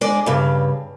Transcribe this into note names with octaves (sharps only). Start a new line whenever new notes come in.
G#3 D4 G#4 D5
G2 C#3